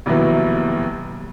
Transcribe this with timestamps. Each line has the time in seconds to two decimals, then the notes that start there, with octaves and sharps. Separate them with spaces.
0.06 F1 D#2 B2 F#3 E4 B4